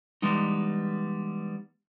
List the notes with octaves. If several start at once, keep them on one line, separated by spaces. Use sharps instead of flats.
E3 G3 G#3 B3 D#4